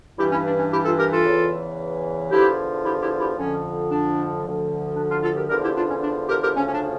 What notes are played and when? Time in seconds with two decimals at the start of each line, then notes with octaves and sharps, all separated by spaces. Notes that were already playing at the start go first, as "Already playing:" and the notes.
0.19 G2 E3 E4 G4
0.32 C#4 E4
0.46 D4
0.59 C#4
0.72 E4 G4
0.85 F4 A4
0.98 G4 A#4
1.11 F4 A4
1.25 E2 C#3 E3
2.31 E2 D3 F3 E4 G4
2.84 E4 G4
3.01 E4 G4
3.20 E4 G4
3.37 F2 D3 F3 C#4
3.90 D4
4.43 D2 D3 F3
4.96 D4
5.09 D4 F4
5.22 F4 A4
5.36 G4 A#4
5.49 E2 D3 F3 G4 A#4
5.63 E4 G4
5.76 D4 F4
5.89 C#4
6.02 D4
6.29 G4 A#4
6.42 G4 A#4
6.55 D2 C#3 F3 C#4
6.68 C#4
6.73 D4